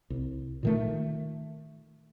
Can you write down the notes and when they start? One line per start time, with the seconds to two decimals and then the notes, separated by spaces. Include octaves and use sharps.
0.10 C2
0.63 A#2 D#3 A3